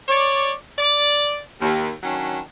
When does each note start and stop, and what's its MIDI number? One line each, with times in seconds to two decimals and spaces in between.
0.08 0.52 73
0.08 0.52 74
0.77 1.37 74
1.61 1.91 39
2.03 2.39 51
2.03 2.39 54
2.03 2.39 61
2.03 2.39 62